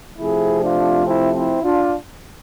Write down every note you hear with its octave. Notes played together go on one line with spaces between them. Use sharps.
C3 F3 A3 C4 E4 G#4
D4 F4
C4 E4
C4 E4
D4 F4